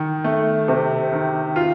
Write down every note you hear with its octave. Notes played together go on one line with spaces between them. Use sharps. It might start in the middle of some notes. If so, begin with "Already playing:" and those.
Already playing: D#3
A3
C3
D#3
F4